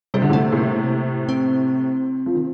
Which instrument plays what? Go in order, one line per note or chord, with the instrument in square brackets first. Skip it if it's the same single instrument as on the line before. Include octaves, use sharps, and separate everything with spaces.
[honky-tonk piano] C3 [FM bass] G3
[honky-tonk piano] D3
[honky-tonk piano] A2 C3 [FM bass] A3
[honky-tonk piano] A2 C3 [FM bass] A#3
[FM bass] C4
[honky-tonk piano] F3
D#3